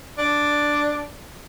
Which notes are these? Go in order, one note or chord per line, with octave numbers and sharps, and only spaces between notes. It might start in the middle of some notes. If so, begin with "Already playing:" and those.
D4